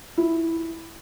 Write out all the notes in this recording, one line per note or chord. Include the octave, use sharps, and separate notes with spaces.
E4